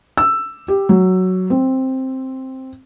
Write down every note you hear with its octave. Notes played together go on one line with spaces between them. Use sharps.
E6
G4
F#3
C4